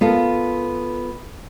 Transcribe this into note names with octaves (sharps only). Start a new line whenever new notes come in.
B3 F4 A4 A#4